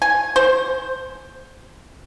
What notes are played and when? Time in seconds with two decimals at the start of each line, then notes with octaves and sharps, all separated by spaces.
0.02 G#5
0.36 C5